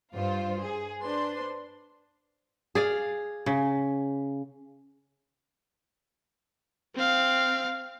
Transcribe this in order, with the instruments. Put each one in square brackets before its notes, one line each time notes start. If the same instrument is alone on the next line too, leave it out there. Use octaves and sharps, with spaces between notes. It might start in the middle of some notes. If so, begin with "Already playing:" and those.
[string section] G2 F4 C5
G#4
D4 B4 C5 C6
[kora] G#4 D5 F5
C#3
[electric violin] C4 F5